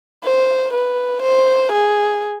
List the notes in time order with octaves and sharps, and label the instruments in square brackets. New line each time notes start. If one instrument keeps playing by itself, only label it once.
[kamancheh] C5
B4
C5
G#4